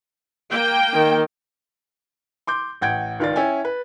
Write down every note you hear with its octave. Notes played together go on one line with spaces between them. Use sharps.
A#3 G5
D#3
C6 D6 G6
A1 F#5 G5 G6 G#6 D7
C#2 D#3 F4 D5 A6
C#4 E4 E5 G5 G#5
B4